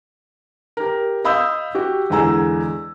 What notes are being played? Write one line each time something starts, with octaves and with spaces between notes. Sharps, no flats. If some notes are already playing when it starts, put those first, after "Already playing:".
G4 A#4
D#5 F5 B5 D#6 E6 G6
F#4 G4
E2 D3 G#3 G#5 A#5 E6